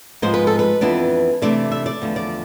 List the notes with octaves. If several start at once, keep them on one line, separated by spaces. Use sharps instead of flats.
G#2 F3 G#3 B3 C5
B4
A4
B4
F2 E3 B3 D4
C3 E3 A3 D4 D5
E5
D5
E2 D3 F3 A3
D5